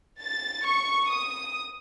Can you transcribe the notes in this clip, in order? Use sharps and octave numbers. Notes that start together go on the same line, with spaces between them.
A6
C#6
D#6